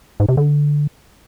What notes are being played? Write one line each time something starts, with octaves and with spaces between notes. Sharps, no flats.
G#2
C3
D3